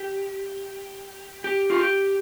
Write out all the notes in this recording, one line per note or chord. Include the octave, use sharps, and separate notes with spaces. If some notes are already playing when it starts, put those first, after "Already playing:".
Already playing: G4
G4
F4
G4